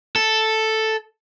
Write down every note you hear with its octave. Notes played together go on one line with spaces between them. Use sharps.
A4